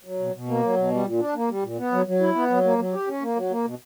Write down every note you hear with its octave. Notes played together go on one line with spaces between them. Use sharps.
F#3
B2
B2
A#3
F#3
B2
G3
A#2
D4
A#3
G3
A#2
B3
F#3
F#3
E4
B3
F#3
A#3
F#3
G4
C#4
A#3
F#3
A#3
B2